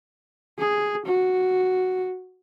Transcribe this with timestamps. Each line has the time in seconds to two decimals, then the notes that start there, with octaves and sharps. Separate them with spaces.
0.58 G#4
1.05 F#4